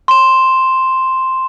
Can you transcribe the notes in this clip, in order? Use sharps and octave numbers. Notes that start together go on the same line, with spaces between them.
C6 E7